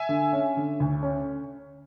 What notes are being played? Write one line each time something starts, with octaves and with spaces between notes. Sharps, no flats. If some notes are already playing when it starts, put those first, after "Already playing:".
Already playing: E5 G#5
D3
C#4
D3
D2
C#4